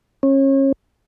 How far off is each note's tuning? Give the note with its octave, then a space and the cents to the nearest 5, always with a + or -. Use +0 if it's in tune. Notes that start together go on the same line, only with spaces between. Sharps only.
C#4 -30